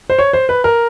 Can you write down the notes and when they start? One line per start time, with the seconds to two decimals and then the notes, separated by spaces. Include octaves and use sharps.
0.10 C5
0.19 C#5
0.33 C5
0.49 B4
0.64 A#4